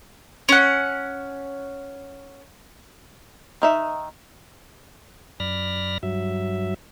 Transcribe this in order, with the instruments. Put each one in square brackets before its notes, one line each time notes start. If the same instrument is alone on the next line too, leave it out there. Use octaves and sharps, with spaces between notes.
[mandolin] C#4 F#5
[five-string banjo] D#3 D#4 E5
[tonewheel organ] F#2 D5 B5 F6 A#6
G2 F#3 E5